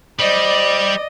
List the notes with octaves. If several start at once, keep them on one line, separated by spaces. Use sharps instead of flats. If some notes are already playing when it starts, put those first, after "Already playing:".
G3 C5 D5 D#5